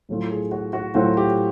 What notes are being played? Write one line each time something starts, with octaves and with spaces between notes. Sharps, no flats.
A2 F#3 A3 C4 F4
G#4
F#4
F#4
A2 F#3 A3 C4 F4 F#4
G4